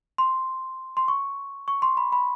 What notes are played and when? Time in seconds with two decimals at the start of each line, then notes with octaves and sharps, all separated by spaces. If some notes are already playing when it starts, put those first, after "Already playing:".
0.18 C6
0.97 C6
1.08 C#6
1.68 C#6
1.82 C6
1.97 B5
2.12 B5